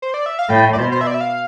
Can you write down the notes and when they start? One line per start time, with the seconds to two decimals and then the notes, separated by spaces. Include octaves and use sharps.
0.02 C5
0.14 D5
0.26 E5
0.39 F5
0.49 A2 G5
0.73 D5
0.78 B2 C5
0.92 C5
1.01 E5
1.07 D5
1.14 E5
1.21 F5